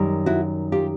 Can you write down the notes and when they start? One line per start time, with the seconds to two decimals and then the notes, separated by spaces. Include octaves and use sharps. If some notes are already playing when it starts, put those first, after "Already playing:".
Already playing: F#2 D#3 G3
0.26 E4 F#4
0.72 F4 G4